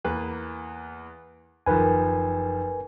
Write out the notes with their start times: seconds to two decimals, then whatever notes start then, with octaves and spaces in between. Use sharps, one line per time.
0.05 E2 A#3 B4
1.66 F#1 D#3 F3 A#4 B4 G#5